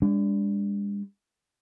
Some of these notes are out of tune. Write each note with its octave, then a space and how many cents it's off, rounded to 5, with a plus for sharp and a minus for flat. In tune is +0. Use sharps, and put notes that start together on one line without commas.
G#3 -45 D4 -20